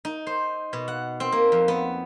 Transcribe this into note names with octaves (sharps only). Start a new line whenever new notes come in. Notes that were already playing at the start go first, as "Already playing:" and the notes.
D#4
C5
B2
F#5
C4
A#3
F2
B3